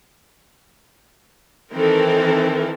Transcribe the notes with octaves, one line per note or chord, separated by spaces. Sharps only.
D#3 E3 C4 A4 A#4